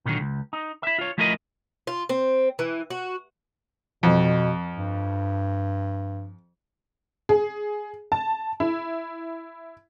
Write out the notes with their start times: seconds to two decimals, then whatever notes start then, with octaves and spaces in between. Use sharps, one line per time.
0.05 A#2 D3 D#3 F#3
0.20 C#2
0.53 D#4
0.83 E4 E5
0.99 F4 C#5
1.18 F3 A3 E4 F4 A#4 D#5
1.87 F4
2.09 C4
2.59 E3
2.90 F#4
4.03 F2 B2
4.75 G2
7.29 G#4
8.12 A5
8.60 E4